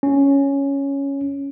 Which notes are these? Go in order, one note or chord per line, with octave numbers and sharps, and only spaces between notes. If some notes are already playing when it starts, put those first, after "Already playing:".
C#4